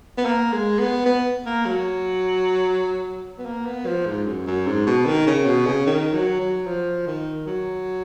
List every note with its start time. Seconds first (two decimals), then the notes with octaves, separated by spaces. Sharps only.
0.17 B3
0.25 A#3
0.53 G#3
0.79 B3
1.06 B3
1.46 A#3
1.66 F#3
3.38 B3
3.46 A#3
3.66 B3
3.86 F3
4.06 G#2
4.26 F#2
4.47 F#2
4.67 G#2
4.87 B2
5.06 D#3
5.27 C#3
5.46 B2
5.66 C#3
5.87 D#3
6.13 F#3
6.40 F#3
6.67 F3
7.07 D#3
7.47 F#3